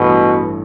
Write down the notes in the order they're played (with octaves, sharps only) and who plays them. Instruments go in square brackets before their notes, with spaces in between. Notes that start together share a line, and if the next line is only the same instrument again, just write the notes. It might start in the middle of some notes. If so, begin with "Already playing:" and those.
Already playing: [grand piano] A1 G2 E3 A3 [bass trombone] B2